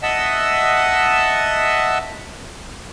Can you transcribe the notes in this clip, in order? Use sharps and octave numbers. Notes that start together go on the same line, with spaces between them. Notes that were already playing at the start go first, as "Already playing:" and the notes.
D#5 E5 F#5 A5 E6